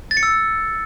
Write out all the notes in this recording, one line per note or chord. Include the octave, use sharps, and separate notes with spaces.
A6
C#7
E6